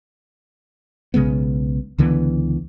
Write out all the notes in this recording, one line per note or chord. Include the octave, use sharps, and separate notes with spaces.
B1 C#3 G#3 B3
C#2 D3 E3 B3